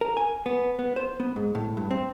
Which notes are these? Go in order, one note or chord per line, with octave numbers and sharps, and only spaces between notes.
A#4
G#5
B3
B3
C5
B3
G#2
A2
G2
C4